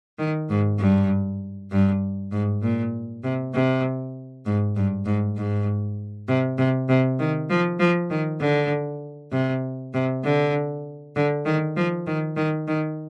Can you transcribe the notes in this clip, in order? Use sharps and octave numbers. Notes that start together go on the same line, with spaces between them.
D#3
G#2
G2
G2
G#2
A#2
C3
C3
G#2
G2
G#2
G#2
C3
C3
C3
D#3
F3
F3
D#3
D3
C3
C3
D3
D3
D#3
F3
D#3
D#3
D#3